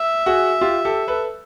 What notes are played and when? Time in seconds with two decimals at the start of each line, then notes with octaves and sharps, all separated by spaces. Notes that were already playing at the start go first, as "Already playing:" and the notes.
Already playing: E5
0.26 F#4 G#4
0.61 F4 G4
0.85 G4 A4
1.08 A4 B4